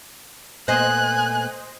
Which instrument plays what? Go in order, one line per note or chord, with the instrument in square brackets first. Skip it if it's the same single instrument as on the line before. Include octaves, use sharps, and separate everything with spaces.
[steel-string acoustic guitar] A#2 A3 B3 [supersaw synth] C5 D#5 [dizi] G#5 [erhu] F#6